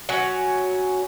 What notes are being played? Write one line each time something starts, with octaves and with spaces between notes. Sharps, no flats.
F#3 C#4